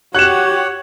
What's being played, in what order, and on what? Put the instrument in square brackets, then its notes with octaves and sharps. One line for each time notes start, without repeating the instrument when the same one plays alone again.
[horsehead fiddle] F#4 G4 [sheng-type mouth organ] C#5 F#5 [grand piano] F#6 E7